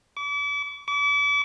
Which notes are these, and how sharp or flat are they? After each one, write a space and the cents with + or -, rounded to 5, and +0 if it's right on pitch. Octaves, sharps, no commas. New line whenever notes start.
D6 -40
D6 -40